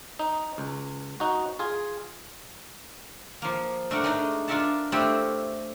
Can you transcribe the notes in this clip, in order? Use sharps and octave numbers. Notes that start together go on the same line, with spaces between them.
D#4
C#2
D#4 F#4
F4 G#4
F3 A#3
A3 D4 A#4 F#5
G#3 A3 D4 D#4
D4 F4 A#4 E5 F#5 A5
A3 C4 D4 E4 F4 G4